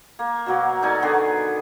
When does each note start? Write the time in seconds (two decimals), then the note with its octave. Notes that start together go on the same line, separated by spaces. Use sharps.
0.19 A#3
0.46 B2 F#3 A#3
0.83 D#4 A4 D5 G#5
1.02 D3 D#3 B3 G#4